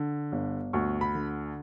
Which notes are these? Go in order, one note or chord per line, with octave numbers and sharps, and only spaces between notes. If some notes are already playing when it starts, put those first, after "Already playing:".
Already playing: D3
G1
D2 C#6
B5
D3